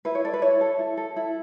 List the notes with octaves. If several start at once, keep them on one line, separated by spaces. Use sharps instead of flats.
E4 B4
C#5
A4 D5
B4
E4 C#5
A4
E4
A4
E4